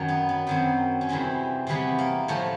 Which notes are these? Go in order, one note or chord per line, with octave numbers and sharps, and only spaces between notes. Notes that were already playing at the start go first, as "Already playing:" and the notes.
Already playing: F#2 D#3 F#3
B3
B3
F#2 D#3 F#3 C4
C#4
E2 C3 E3 G3 C4
E2 C3 E3 G3 B3
A#3
A2 F3 A3